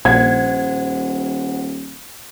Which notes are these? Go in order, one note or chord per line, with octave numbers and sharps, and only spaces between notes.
D#1 A#1 C5 F#5 G#6